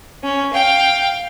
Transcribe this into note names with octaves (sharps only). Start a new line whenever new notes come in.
C#4
F5 G5